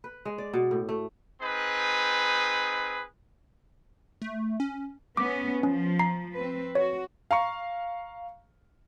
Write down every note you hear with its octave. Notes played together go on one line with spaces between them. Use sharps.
B4
G#3
D5
B2
A2
A3
C4 D#4 G#4 B4
A3
C#4
B3 C#4 D6
F3 C#4
A#5 C7
C4 B4
F#4 C#5
F5 A#5 C#6